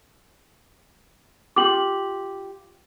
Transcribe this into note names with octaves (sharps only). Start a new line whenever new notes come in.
F4 G4 D6 F#7